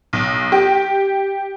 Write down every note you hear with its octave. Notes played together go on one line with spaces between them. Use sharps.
B1
G4